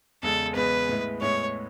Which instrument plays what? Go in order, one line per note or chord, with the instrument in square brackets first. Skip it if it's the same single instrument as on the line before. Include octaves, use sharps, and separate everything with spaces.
[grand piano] E2 C#3 G#3 [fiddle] A4
[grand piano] E2 C#3 G#3 [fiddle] B4
[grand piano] A2 G#3 B3 E4
[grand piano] A2 G#3 B3 E4 [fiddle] C#5